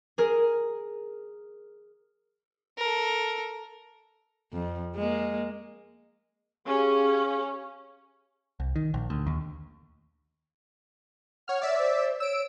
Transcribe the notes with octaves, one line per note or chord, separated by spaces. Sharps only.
G#4 A#4
A4 A#4
F2
G#3 A#3
C#4 G4 G#4 F5
C2
D#3
A#1
D2
D#2
C#5 F#5 F6
C#5 D5 E5
C5
C#5 E6 D7